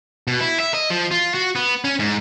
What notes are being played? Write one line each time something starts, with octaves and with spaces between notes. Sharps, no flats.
B2
E4
E5
D#5
F3
F4
F#4
B3
C#4
G#2